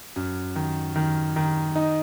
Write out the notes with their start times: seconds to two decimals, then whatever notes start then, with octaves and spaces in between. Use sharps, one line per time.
0.16 F#2
0.56 D#3
0.96 D#3
1.36 D#3
1.76 D#4